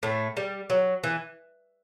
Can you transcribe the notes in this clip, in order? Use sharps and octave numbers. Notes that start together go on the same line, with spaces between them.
A2 A3
G3
F#3
E3